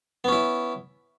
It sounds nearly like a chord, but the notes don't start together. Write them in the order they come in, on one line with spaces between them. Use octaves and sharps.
B3 C#4 E4